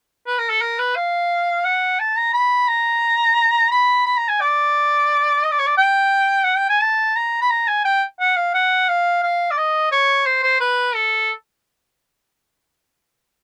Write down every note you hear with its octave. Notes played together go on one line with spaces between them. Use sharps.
B4
A#4
A4
A#4
B4
F5
F#5
A5
A#5
B5
A#5
B5
B5
A#5
G#5
D5
D#5
D5
C#5
D5
G5
F#5
G5
G#5
A5
A#5
B5
A#5
G#5
G5
F#5
F5
F#5
F5
F5
D5
D#5
C#5
C5
C5
B4
A4